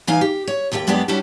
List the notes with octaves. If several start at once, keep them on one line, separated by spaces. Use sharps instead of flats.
E3 D#4 F5 G#5
G4
C#5
D#2 A3 G4 F#5 G5
F#2 G#3 B3 D4 G4 D5
G3 C#4 D4 E4 F#4 G4